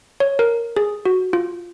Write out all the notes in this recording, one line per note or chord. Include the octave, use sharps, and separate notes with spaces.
C#5
A#4
G#4
F#4
F4